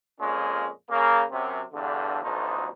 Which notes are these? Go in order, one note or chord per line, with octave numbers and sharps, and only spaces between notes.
F2 A#2 G#3 C#4
C#3 A#3
F#2 C3
E2 G2 D3
A1 D2 B2 F3 D#4